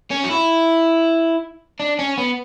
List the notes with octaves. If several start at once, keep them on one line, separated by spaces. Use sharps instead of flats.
C#4
F#4
E4
D4
C#4
B3